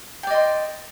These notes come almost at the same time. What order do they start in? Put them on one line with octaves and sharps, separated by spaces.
G5 D5 D#5 C6